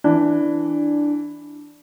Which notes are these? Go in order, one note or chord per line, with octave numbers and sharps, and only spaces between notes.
E3 D4